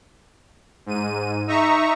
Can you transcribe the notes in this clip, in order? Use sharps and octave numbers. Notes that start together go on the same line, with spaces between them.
G#2 D#7
D#4 E5 A#5 C#6